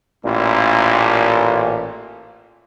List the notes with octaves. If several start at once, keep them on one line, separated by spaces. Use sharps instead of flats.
A1 A#2